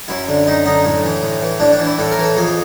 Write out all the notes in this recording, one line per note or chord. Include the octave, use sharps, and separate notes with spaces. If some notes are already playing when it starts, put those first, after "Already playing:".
F#2 E4
D3
F#2 D#4
D3 D#4
A2
E3
A2
E3
A2 D4
D4
E3
E4
A2 A4
A#4
E3
A4
F2 G#4